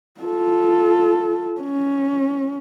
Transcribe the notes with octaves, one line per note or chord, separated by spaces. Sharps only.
F4 A4
C#4